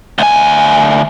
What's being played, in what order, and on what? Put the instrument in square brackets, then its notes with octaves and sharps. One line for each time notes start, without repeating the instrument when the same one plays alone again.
[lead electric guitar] D2 G#5